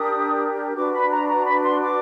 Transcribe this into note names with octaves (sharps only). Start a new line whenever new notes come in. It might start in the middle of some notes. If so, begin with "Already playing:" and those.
Already playing: D4 G4 A#4 D#6
D4 F#4 B4 D6
B5
A#5
A#5
B5
C6
D6